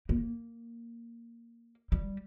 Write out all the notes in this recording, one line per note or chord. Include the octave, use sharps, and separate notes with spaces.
A#3
G3